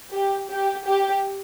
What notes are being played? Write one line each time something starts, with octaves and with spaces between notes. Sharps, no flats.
G4
G4
G4